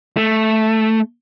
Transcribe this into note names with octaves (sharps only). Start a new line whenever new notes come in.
A3